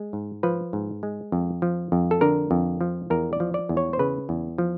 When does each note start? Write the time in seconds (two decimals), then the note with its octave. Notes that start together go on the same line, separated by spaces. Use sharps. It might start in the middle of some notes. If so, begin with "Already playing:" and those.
Already playing: G#3
0.13 G#2
0.43 F3 B4
0.73 G#2
1.03 G#3
1.32 F2
1.62 F3
1.92 F2
2.11 A4
2.21 D3 A#4
2.51 F2
2.81 F3
3.10 E2 A#4
3.33 D5
3.40 F3
3.54 D5
3.69 E2
3.77 C#5
3.93 C5
3.99 C#3 B4
4.29 E2
4.58 F3